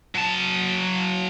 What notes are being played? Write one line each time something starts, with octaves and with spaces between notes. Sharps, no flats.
F#3 A5